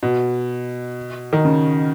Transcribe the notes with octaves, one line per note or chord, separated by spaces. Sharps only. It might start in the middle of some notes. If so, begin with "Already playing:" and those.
B2
D#3
C#3